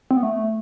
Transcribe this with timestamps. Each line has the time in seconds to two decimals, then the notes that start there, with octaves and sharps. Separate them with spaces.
0.11 C4
0.17 B3
0.23 A3